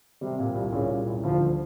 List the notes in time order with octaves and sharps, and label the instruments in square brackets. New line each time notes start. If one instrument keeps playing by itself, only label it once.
[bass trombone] C3 [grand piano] G3
[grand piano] A#2
C2
[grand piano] A#2 [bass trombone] C#3
[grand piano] C2
C2
[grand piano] D2 [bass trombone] F3
[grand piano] D3